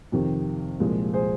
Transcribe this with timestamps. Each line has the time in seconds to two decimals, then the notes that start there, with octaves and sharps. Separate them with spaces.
0.12 F2 C3 D#3
0.80 C2 A#2 F3 G#3
1.14 G#4 C5